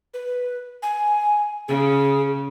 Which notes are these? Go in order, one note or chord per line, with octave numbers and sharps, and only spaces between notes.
B4
G#5
C#3 G#4